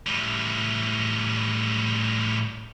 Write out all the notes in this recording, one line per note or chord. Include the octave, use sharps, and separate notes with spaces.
A2 G3